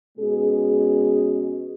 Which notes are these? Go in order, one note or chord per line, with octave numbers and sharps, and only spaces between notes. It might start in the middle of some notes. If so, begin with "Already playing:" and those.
B2 G#3 C#4 G#4